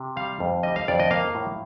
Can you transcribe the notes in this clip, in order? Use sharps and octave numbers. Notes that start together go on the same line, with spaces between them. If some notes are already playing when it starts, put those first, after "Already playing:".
Already playing: C3
G3 F5
F2
G3 D#5
F5
F2 D5
D#5
A#3 F5
A2